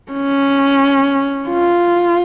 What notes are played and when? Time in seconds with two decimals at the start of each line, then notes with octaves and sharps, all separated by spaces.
0.11 C#4
1.48 F4